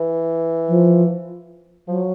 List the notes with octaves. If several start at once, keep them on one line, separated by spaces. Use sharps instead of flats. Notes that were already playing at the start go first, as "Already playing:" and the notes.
Already playing: E3
F3
F3 F#3